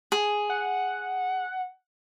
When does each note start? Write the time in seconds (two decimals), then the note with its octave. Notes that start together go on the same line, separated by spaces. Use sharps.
0.12 G#4
0.50 F#5